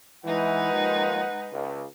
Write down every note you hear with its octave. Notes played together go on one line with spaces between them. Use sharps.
E3 G#3 D#4 B4 F#5
D#2 D#3 F3
C#2